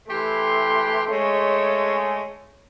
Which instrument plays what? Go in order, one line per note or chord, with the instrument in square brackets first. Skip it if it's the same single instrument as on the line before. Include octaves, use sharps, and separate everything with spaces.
[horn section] E3 G4 C6 [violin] A3
[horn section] G#3 A3 [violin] C#5